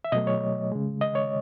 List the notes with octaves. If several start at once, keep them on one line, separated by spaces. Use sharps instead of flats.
E5
B2 F#3 A3 D#5
C#5
C#3 G#3
D#5
C#5